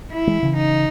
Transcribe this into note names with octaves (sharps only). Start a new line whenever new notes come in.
E4
E3 G#3
C#3 E3
D#4